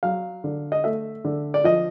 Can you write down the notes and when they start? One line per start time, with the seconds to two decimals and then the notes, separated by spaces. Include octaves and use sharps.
0.03 F#3 F5
0.44 D3
0.72 D#5
0.84 A3 E5
1.24 D3
1.54 D5
1.64 F3 D#5